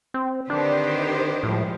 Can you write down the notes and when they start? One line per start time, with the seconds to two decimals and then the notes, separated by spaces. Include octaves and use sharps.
0.14 C4
0.50 D3 D#3 C4 D4 G4 B4 C5
1.43 A2 F3 G3 G#3